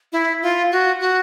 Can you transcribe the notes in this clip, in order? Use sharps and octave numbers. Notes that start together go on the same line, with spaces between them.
E4
F4
F#4
F#4